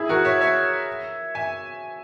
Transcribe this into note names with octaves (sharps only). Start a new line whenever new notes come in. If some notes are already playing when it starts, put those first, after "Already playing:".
Already playing: E4 G#4
F#4 A#4
C#5 E5
C#5 E5
E5 G#5